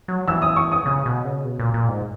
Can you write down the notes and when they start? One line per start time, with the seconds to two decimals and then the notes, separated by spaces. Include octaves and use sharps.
0.08 F#3
0.28 E3 E6
0.42 D#6
0.56 C#6
0.72 D#6
0.86 C#3 D#6
1.06 B2
1.25 C#3
1.45 B2
1.59 A#2
1.74 A#2
1.88 G#2